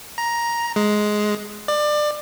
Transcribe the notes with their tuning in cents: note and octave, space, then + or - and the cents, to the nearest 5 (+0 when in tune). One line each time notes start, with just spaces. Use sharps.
A#5 +10
G#3 +10
D5 +25